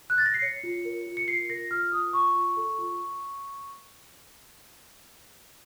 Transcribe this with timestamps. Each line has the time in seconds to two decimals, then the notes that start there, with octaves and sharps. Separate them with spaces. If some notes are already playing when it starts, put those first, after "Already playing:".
0.10 F#6
0.18 A6
0.26 A#6
0.34 C7
0.42 C#5 C#7
0.63 F4
0.85 A#4
1.06 F4
1.17 C#7
1.28 F4 C7
1.50 A#4 A#6
1.70 F4 F6
1.92 F4 D#6
2.13 F4 C#6
2.35 F4
2.57 A4
2.78 F4